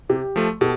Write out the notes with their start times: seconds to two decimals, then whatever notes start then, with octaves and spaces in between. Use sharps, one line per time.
0.09 C3 G4
0.36 F3 A3
0.61 B2 G4 A4